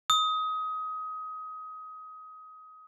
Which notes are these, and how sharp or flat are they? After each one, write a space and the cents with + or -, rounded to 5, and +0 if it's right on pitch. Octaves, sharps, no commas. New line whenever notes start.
D#6 +25